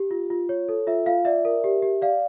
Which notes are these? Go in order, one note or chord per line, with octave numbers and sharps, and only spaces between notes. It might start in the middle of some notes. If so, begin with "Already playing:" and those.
Already playing: G4
F4
F4
C#5
A4
F4 E5
F4 F5
D5 E5
A#4
G4
G4
D5 F5